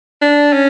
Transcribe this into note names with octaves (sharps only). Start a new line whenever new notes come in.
D4
C#4